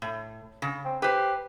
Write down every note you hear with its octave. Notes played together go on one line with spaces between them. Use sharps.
A2
C#3
C4
G4 B4 C5